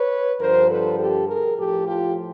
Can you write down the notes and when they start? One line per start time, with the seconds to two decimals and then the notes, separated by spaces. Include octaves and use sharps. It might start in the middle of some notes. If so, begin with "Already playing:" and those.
Already playing: B4 C#5
0.41 G2 D3 F3 A#4 C5
0.70 A4 B4
0.99 G4 A4
1.28 G#4 A#4
1.58 A2 F3 G4 A4
1.87 F4 G4